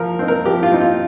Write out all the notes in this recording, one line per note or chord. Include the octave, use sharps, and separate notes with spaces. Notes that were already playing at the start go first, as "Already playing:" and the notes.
Already playing: F3 A#4
C4 D#4
A#4
F3 G4
F4
C4 D#4
F4